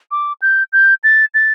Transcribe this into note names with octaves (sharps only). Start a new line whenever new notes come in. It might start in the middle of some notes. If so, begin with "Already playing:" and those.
D6
G6
G6
A6
A6